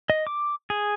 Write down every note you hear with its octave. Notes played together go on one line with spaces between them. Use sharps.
D#5
D6
G#4